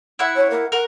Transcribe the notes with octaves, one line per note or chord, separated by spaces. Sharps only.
E4 F#5
C#5
A#4
A#4 F#5